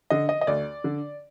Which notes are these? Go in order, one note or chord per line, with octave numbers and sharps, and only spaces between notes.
D3 D#5
D#5
D#5
D2 D5
D3